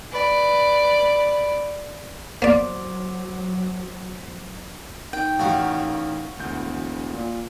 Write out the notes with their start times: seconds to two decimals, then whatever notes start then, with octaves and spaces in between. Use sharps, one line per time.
0.12 B4 D5
2.42 F#3 A#3 C5 D5 D6
5.13 D#3 G5
5.39 A1 F#4 G4 F5 F#5
6.39 E1 D2 G6
7.13 A#2